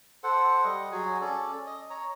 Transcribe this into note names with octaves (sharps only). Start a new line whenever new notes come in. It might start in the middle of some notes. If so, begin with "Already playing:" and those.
A4 C5 F#5
G3 D#5
F#3 F#4 G#4 G#5
C#4 A4 D5
D#5
C#5 A#5